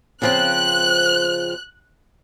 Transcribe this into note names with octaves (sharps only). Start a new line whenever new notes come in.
C#3 F3 C4 F#6